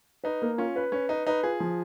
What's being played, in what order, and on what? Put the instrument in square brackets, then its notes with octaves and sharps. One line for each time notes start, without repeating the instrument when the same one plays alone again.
[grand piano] D#4 [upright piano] B4
[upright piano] A#3
[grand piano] C#4 [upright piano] F4
[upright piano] B4
[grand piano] C#4 [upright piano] B4
[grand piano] D#4 [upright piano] B4
[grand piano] D#4 [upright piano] B4
[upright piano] F4 [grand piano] G#4
[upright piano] F3